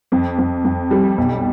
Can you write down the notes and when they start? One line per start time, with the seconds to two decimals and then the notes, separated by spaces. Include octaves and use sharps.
0.12 F2
0.38 F2
0.65 F2
0.91 G3
1.18 B1